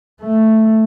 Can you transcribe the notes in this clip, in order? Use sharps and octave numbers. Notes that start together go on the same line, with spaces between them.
A3